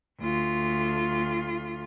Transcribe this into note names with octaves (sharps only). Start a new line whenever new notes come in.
D2 F4